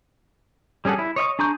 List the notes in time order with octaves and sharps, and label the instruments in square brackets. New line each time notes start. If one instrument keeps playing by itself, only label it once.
[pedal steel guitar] G3 C#4 G#4 A4 F#5
E4
C#5 D#5 E5 C#6
D4 G#4 A#5 C#6 G6